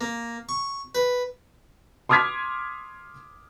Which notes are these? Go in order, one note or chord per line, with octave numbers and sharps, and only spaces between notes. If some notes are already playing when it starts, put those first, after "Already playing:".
A#3
C#6
B4
C6 D6 D#6 F6 G#6 B6